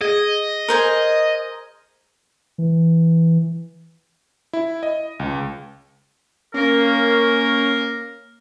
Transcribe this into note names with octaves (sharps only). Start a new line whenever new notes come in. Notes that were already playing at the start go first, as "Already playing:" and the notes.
G#4 D#5
A#4 C5 G#5
E3
E4
D#5
C#2
A#3 C#4 A#4